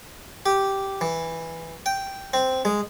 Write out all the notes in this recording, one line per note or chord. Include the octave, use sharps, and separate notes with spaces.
G4
E3
G5
C4
G#3